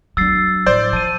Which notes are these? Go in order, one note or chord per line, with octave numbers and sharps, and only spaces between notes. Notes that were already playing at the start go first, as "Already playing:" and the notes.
F#3 D4 E6 A6 C7
A2 F3 C5 D5 G6
F3 A5 D#7